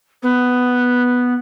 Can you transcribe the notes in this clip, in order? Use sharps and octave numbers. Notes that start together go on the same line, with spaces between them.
B3